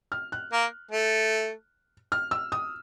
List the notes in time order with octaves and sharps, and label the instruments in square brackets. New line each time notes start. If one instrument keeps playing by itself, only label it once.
[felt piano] F6
F#6
[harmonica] A#3
A3
[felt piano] F6
E6
D#6